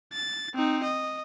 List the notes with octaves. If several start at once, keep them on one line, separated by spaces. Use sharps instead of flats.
A6
C4 D#4
D#5